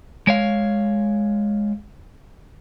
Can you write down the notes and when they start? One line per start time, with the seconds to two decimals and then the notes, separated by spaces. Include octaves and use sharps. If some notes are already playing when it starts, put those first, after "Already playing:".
0.27 G#3 C#5 F5